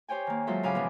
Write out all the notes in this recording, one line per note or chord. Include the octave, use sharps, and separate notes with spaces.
G4 C5 C#5 G5 G#5
D#3 A#3
F#3 G#3 F4 A4 C5 E5
G#2 C#3 F5 G#5 B5 D6
B2 E3 F3 G#3